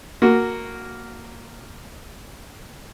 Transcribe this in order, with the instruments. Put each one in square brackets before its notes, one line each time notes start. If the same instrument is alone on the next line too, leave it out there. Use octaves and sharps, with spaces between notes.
[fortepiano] A#3 F#4